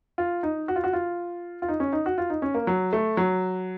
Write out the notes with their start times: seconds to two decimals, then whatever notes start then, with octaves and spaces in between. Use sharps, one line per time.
0.18 F4
0.43 D#4
0.68 F#4
0.76 F4
0.84 F#4
0.93 F4
1.62 F4
1.68 D#4
1.80 C#4
1.93 D#4
2.06 F#4
2.18 F4
2.30 D#4
2.42 C#4
2.54 A#3
2.67 F#3
2.93 A3
3.17 F#3